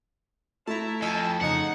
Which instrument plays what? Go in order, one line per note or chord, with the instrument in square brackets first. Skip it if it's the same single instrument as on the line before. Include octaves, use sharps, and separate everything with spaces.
[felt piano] A3 [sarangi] E4 [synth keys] A5 A#5
[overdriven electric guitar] F2 [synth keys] D#5 G#5 E6 [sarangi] A5
[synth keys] F2 C#3 G#6 [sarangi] D#4 [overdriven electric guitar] F#5